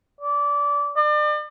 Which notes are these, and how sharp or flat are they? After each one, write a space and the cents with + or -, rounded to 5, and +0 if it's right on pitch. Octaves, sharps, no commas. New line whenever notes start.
D5 -20
D5 +40